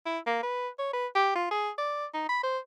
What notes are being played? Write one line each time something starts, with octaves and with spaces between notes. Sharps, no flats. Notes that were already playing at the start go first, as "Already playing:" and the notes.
E4
A#3
B4
C#5
B4
G4
F4
G#4
D5
D#4
B5
C5